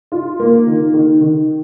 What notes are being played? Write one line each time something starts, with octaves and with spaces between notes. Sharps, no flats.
F4
A#3
D#3
D#3
D#3